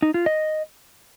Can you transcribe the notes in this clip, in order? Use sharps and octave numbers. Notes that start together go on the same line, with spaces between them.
D#4
F4
D#5